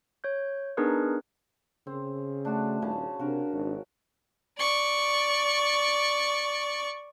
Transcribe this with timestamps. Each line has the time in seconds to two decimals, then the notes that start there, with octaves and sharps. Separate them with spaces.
0.24 C#5 G6
0.77 B3 D4 D#4 G#4 A#4 B4
1.87 C#3 C4
2.45 A3 D4 F#4
2.82 D#1 C#3 A5
3.20 C3 D4 F#4 A#4
3.52 G#1
4.58 D5 C#6